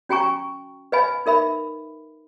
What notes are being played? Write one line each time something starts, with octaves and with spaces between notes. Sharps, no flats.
C#4 F#4 G5 G#5 A#5 C#6
B4 D#5 F5 G#5 B5
D#4 A#4 E5 B5